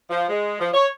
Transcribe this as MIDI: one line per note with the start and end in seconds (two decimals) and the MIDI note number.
0.10 0.27 53
0.29 0.56 56
0.59 0.69 53
0.73 0.87 73